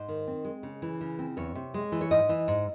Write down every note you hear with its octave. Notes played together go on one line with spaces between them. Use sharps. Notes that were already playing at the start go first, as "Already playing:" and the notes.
Already playing: G#2 C5
D#3
C4
G#3
C#3
E3
C#3
C4
E2 C#5
C3
G#3
E3
C#5
G#2 D#5
E3
G#2